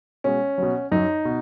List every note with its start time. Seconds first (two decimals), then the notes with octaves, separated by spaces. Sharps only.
0.24 B2 G#3 C#4
0.58 B2 F#3
0.92 F#2 F#3 D#4
1.25 B2